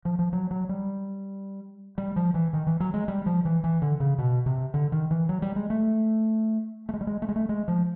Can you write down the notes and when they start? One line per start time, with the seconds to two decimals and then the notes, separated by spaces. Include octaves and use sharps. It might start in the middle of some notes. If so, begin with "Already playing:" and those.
0.05 F3
0.19 F3
0.33 F#3
0.51 F#3
0.69 G3
1.98 G3
2.16 F3
2.34 E3
2.53 D#3
2.67 E3
2.80 F#3
2.94 G#3
3.08 G3
3.26 F3
3.45 E3
3.64 E3
3.82 D3
4.00 C#3
4.18 B2
4.46 C3
4.74 D3
4.92 D#3
5.11 E3
5.29 F#3
5.42 G3
5.56 G#3
5.70 A3
6.89 A3
6.93 G#3
7.01 G3
7.07 G#3
7.22 A3
7.29 G#3
7.36 A3
7.49 G#3
7.68 F3